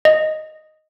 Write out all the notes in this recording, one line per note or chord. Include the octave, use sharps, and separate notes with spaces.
D#5